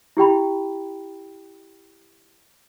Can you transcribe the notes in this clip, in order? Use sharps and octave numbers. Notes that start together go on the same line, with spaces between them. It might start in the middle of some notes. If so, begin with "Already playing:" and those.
E4 G4 G5 B5